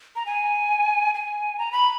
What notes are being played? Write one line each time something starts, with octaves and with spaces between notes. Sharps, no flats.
A#5
G#5
G#5
A#5
B5